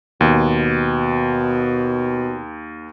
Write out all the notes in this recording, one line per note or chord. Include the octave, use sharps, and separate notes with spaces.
D#2 B2